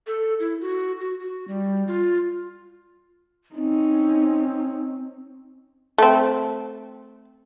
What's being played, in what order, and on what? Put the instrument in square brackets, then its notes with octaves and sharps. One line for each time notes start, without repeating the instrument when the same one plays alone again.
[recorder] A4
E4
F#4
F#4
F#4
G3
F4
[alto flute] C4 [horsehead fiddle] C#4 D#4
[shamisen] A3 C4